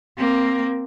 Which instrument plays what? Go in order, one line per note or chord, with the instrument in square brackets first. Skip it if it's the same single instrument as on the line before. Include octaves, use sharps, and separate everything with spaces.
[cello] A#3 C4